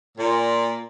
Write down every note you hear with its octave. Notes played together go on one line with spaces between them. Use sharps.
A#2